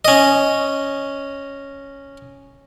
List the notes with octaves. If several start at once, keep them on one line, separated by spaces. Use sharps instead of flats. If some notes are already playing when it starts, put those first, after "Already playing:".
C#4 D#5